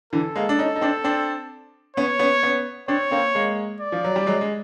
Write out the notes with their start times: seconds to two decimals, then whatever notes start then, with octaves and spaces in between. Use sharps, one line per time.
0.13 D3 E3 A4
0.36 G#3 A#3
0.49 D4
0.59 C#4 D#4
0.76 D#4
0.81 C4 D4
1.04 C4 D4
1.97 B3 C#4 C#5
2.19 B3 C#4
2.43 B3 C#4
2.88 C4 D4 C#5
3.11 A#3 C4
3.35 G#3 A#3
3.80 D5
3.92 F3
4.05 F#3
4.16 G3
4.27 F#3 G#3
4.41 G#3